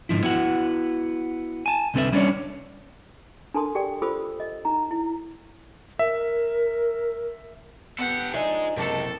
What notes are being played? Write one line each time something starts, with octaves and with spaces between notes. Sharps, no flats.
G#2 D3 F3 E4
B3 E4 F#4 F#5
G#5 A5
C2 D3 C4 A4 B4 E5
G3 C#4 D4 G#4 C#5 D5
D4 A4 A#4 A5 C6 D#6
G4 A#4 D5 G5
F4 A4 C5 B5 D#6 E6
D#5
D#4 A#5
E4
A#4 E5
B3 G4 A4 F#5
F3 D4 D#4 G#4 D#5 E5 G#5
F#1 C3 G#3 A4 A5 C#7